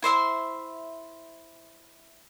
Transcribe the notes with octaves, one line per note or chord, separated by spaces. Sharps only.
E4 C5 E5 C6